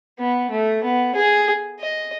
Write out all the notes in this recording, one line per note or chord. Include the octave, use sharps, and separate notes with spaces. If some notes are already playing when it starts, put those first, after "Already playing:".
B3
A3
B3
G#4
D#5